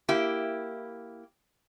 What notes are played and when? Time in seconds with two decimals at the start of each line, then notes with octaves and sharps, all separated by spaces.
0.09 A#3 E4 G4